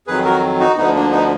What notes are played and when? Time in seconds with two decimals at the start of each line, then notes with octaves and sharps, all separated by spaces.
0.07 F2 D#3 F#3 G#4 B4
0.24 F#4 A#4
0.59 D#4 F#4
0.77 D2 D3 F3 B3 D#4
0.95 A#3 D4
1.11 B3 D#4